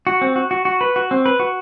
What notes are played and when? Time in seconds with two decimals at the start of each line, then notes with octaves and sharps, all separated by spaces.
0.07 F#4
0.21 C4
0.36 F#4
0.51 F#4
0.65 F#4
0.81 B4
0.96 F#4
1.11 C4
1.26 B4
1.40 F#4